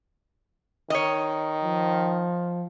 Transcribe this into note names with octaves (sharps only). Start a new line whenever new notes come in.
D#3 C#5 D#5
F3